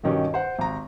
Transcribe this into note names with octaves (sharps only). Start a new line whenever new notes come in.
G2 B2 D#3 C#4 G4
C5 F#5
G#1 A#5